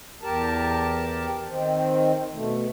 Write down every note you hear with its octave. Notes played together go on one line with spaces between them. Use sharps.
E2 G4 A#4 A5
D#3 C4
B2 A3